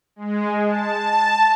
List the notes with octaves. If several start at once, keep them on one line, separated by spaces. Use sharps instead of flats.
G#3
A5